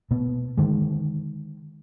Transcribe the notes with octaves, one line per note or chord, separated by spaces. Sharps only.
B2 B3
D3 D#3 G#3